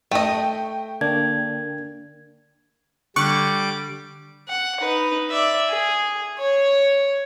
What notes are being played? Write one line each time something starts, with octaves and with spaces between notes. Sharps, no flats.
A3 D#5 G5 C#6
D3 A#3 D4 G#6
D3 G3 C#6 D6 F#6 C#7
F#5
D#4 B4
D5 E5
G#4
C#5